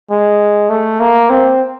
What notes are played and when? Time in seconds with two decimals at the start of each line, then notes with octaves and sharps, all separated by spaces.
0.10 G#3
0.69 A3
1.00 A#3
1.29 C4